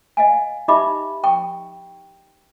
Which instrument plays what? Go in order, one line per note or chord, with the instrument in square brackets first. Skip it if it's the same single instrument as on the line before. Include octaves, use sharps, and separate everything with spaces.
[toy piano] D#5 F5 G#5
D#4 G4 D#5 E5 B5 D6
G5 C#6